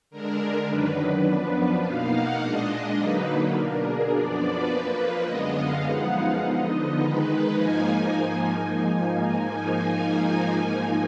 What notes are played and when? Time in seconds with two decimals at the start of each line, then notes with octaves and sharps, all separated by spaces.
0.10 D3 G#3 D4 A#4
0.68 F#2 D#3 F#3 D4 B4
1.25 F#2 F3 B3 D4 B4
1.82 B2 A#3 D#4 F5
2.11 F#5
2.39 A#2 G#3 D4 D#5
2.96 D3 F#3 A#3 D#4 B4
3.53 B2 A#3 D4 A#4
3.82 G#4
4.10 F#2 F3 B3 D4 D5
4.39 B4
4.67 F2 F3 A#3
5.25 F#2 D3 G#3 B3 D#5
5.53 F5
5.82 F#2 F3 G#3 B3 D#4 F#5
6.10 F5
6.39 D3 F3 B3 D#4 D#5
6.68 D#5
6.97 D#3 G#3 D#4 B4
7.54 G#2 F3 A#3 D#4 G#5